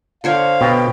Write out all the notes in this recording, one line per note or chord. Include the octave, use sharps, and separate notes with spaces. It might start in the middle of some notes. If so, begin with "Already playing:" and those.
D3 C5 C#5 F5
B2 G5